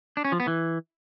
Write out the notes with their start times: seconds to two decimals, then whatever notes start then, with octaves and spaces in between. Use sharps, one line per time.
0.17 D4
0.25 C#4
0.32 F3
0.40 B3
0.47 E3